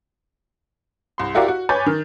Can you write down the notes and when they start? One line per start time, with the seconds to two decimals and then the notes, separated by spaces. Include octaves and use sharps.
1.18 C2 C6
1.35 E4 F#4 G4 A#4 D5 F5
1.48 F#4
1.69 B4 C#5 G#5 D6 G6 A6
1.86 D#3